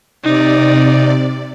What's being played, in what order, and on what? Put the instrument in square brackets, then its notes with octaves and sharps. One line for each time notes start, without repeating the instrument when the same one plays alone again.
[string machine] C3 D5 [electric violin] D#4